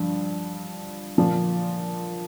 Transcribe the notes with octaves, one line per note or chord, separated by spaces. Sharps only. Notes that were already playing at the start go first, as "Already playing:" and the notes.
Already playing: G2 F3
A#2 F3